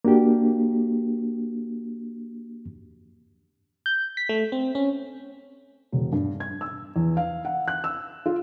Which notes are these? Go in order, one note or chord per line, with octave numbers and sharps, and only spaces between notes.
A#3 D4 F#4 G4
G6
B6
A3
C4
C#4
E1
G2
G#6
E6
E2
F5
F#5
F#6
E6
F4